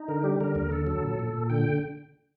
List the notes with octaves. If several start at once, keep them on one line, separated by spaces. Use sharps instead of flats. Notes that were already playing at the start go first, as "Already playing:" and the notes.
Already playing: D#4
D3 A#4
G3 G4
D3 A#4
D#2 A#4
D3 A4
F#3 A4
A#2
A#2
A#2
D3 G5